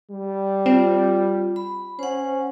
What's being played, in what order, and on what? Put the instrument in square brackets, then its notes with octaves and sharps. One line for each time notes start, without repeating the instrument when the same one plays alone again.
[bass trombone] G3
[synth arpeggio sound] C4 [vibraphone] F4
[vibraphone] B5
[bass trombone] C#4 [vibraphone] C5 F#5